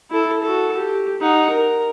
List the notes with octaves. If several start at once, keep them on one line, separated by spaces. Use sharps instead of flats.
E4 A4
F#4 A4
G4
D#4 F#5
A#4